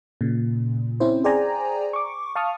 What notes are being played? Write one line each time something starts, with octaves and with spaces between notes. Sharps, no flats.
A#2 C#3
C4 C#4 E4 C5
G#4 C5 D5 G5 G#5 A#5
C#6 D6
F5 A5 C#6 D#6 F6